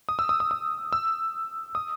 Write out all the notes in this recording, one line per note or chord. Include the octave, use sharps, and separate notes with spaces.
D#6
E6
D#6
D#6
D#6
E6
D#6